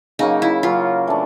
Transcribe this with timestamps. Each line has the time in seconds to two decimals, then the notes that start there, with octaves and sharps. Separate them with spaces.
0.19 C#3 F#3 A#3 D#4
0.42 E4
0.63 C#3 F#3 A#3 F4
1.07 E3 A3 D4